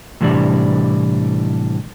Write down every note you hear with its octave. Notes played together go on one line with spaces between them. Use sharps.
A2 C3 E3 G3 D4 D5